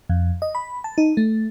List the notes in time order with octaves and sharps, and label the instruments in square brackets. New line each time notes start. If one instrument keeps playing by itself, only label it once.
[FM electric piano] F2
D#5
B5
A5
D#4
A3